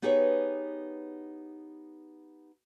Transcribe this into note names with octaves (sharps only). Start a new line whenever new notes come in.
B3 D#4 G4 G#4 B4 C#5